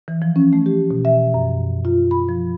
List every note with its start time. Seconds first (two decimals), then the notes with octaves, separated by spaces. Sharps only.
0.08 E3
0.22 F3
0.36 C#4
0.53 A3
0.66 G4
0.91 B2
1.05 E5
1.34 F#2
1.85 F4
2.11 B5
2.29 F3